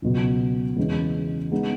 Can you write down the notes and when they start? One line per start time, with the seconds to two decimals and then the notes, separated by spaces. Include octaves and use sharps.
0.02 C#2 B2 F#3
0.77 E2 C#3 G#3 C#4
1.52 G#3 B3 D#4